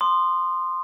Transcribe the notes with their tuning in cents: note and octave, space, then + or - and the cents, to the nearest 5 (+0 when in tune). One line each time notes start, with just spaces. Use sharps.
C6 +0 D#6 -30